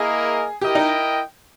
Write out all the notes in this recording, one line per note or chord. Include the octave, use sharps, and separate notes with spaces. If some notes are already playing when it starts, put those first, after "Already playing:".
Already playing: A#3 E4 G#4 A#4 D#5
E4 G4 A#4 D#5 G5
D#4